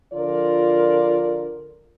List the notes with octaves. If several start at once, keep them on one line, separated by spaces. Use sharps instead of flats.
D3 F3 F4 A#4 D5